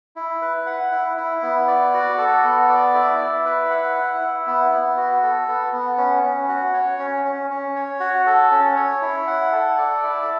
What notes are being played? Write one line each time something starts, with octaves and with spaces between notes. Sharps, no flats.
E4
B4
F#5
E4
E4
B3
D5
F#4
A4
B3
D5
E4
E4
B4
F#5
E4
E4
B3
B3
F#4
A4
B3
B3
C#4
C#4
F#4
C#5
C#4
C#4
C#4
C#5
F#4
A4
C#4
C#5
E4
F#5
A4
D5
E4